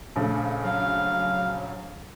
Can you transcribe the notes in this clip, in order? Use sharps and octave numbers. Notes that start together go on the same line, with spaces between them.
A#1 C#3 A3
F#3 F5